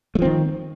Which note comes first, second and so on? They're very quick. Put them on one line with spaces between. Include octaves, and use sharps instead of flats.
A3 F3 C4 D#3